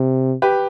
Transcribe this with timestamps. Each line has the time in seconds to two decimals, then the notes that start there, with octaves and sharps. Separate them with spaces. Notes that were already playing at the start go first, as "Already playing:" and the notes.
Already playing: C3
0.42 G4 B4